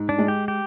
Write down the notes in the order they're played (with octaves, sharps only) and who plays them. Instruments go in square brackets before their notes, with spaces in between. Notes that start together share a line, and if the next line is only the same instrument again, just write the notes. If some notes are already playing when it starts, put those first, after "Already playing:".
Already playing: [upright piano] G#2
[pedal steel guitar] D4
[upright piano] G#3
[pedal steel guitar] G4
G4